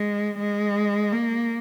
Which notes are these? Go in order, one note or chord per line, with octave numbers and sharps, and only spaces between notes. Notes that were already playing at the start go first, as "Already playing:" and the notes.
Already playing: G#3
G#3
A#3